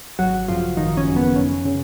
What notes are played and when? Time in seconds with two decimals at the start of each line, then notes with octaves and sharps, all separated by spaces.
0.18 G#1 F#3 F#4
0.48 F#2 C#3 F3 F#3 F4
0.77 G#1 D#3 D#4
0.97 C#4
1.07 F#2 C#3 F#3
1.16 B3
1.36 F#2 C#4
1.65 C#3